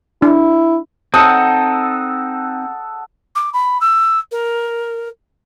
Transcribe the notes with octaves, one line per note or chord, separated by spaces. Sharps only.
D4 E4
C4 D#4 A4 F#5 A5 D#6
D6
B5
E6
A#4